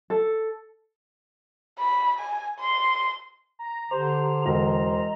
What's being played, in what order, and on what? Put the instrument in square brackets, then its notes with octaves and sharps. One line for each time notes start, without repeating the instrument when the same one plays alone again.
[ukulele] A4
[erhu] B5
G#5
C6
[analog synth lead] A#5
[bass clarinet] D3 [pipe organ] G4 A#5 [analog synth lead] C5
[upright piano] E1 [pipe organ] D#5 A#5